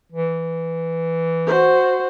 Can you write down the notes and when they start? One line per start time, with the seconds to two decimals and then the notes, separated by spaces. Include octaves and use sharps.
0.12 E3
1.46 F#4 C5